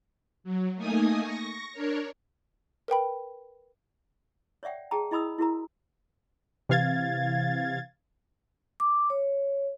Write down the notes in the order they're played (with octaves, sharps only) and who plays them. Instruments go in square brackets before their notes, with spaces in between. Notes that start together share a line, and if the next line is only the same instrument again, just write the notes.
[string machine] F#3
A3 A#3 D#4 G#5 D#6
C#6 A#6
D4 A#4 C#5
[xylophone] A#4 B4 G5 B5
[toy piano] C#5 D5 E5 F#5 G5
G#4 G5 A5 A#5
E4 D#5 B5 D#6 E6
E4 F#4 A#4 A#5
[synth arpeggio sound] C3 E3 F5 G#6 A6
[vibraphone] D6
C#5